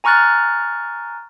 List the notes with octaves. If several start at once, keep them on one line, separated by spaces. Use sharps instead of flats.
G#5 A#5 C#6 F6 F#6 A6